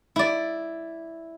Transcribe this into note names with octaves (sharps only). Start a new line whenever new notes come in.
E4 D5